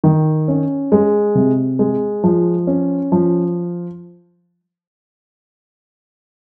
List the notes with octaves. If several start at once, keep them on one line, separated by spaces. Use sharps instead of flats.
D#3
C#4
G#3
C3
G#3
F3
C#4
F3